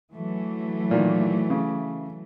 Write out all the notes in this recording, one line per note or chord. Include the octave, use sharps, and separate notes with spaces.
E3 F#3 A3
A#2 D#3
C#3